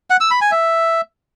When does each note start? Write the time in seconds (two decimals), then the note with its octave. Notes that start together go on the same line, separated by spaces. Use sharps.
0.10 F#5
0.20 E6
0.31 B5
0.41 G#5
0.51 E5